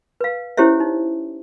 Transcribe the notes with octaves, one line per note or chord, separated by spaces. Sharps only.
B4 F5
C#4 E4 G4 C5 C#5 E5
D#4